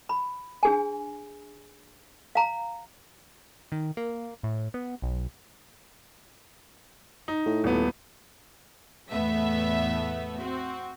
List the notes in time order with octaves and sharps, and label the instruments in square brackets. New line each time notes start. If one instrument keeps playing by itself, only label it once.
[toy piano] B5
D4 G#4 G#5
F5 A#5
[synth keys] D#3
A#3
A2
B3
B1
[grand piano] D#4
[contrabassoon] A2
[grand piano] D#1 B3
[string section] E2 A2 A3 B3 E5
C4 F#4